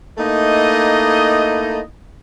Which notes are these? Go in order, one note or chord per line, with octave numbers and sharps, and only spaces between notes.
A3 A#3 D#4 E4 D#5